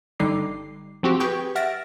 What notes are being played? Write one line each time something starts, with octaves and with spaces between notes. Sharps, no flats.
G1 D3 G3 D#4 D6 C7
F3 C4 F#4 G4
G4 G#4 B4 G5 C#6 G6
E5 F#5 F6 A6 A#6 D7